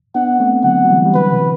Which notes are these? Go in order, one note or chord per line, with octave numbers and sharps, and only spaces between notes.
B3 D4 F#5
A3 C4
D3 F#3 F#5
F#3
E3 G3
G3
D3 F#3 B4
C3 E3